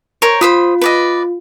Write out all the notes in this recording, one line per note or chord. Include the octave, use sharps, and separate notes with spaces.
A#4 C5 C#5
F4 C5 B5 D#6
B4 D5 D#5